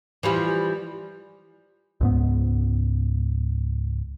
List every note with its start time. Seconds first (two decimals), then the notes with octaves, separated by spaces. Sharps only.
0.23 E3 F3 G3
2.01 C#2 G#2 B3